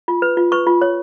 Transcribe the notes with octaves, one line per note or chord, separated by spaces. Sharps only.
F4
B4
F4
B4 C#6
F4
C#5